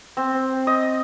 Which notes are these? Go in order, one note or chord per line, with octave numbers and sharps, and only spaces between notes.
C4
D#5